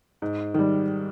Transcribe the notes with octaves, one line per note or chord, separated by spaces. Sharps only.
G#2
D#3 G3